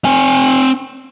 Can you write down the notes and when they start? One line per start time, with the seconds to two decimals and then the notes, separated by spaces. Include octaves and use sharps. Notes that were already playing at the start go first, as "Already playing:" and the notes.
0.05 C4 G#5